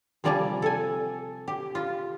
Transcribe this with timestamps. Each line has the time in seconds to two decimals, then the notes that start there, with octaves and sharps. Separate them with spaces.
0.24 C3 F3 G3 D5 G#5 A#5
0.62 A4 G#5
1.48 G4
1.75 F4